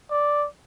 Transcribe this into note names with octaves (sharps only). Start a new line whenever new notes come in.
D5